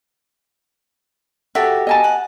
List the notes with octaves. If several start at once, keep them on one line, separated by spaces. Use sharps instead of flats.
F#4 G4 A4 E5
D#5 G#5 A5
F#5